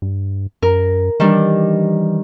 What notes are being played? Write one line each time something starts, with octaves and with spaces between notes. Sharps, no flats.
G2
F#2 A#4
D#3 E3 G3 D4